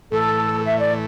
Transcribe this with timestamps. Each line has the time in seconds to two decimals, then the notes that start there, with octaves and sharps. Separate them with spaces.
0.12 A2 E3 A3 A4
0.65 E5
0.79 D5